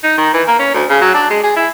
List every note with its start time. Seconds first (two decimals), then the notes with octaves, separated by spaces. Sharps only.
0.03 D#4
0.18 D#3
0.33 E3
0.48 A#3
0.59 C#4
0.74 D2
0.89 C#3
1.01 F#3
1.14 D4
1.30 G#3
1.43 G#4
1.56 E4